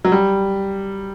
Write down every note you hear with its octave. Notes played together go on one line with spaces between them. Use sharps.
F#3
G3